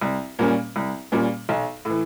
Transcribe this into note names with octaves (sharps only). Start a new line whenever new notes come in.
C2
A#2 G3 A#3 C#4
C2
A#2 G3 A#3 C#4
B1
A2 E3